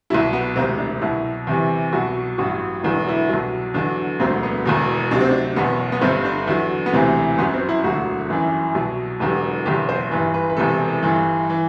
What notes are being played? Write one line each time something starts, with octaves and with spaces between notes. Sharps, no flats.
C2 B2 F#3 E4
B3
E1 D2 C3 C4
D4
C2 B2 F#3 E4
E2 C3 E3
C2 B2 F#3 F#4
A1 G2 F#3 F#4
E1 E2 D3 F#3 E4
D4
E4
C2 B2 F#3
E2 D3 F#3 D4
E1 D2 D3 F#3 C4
B3
E1 E2 B2
D2 C3 F#3 D4
C4
D4
F#1 E2 B2 F#3 B3
B3
G1 G2 D3 C4
D4
E2 D3 F#3 E4
B3
E1 D2 C3 E3 C4
G1 F#2 F#3 B3
C4
E4
E1 D2 D3 F#3 F#4
G1 F#2 E3
C2 B2 F#3
E1 E2 D3 F#3 G4
F#1 E2 B2 F#3 G4
C5
G1 G2 E3 B4
B4
B4
E1 E2 C3 E3 A4
G1 G2 E3
E3